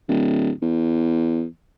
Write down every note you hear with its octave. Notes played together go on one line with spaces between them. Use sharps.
D1
E2